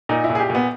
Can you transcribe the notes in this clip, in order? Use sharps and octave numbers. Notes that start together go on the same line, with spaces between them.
A#2 D#4
E4
A#2
G#4
G4
A#2
B3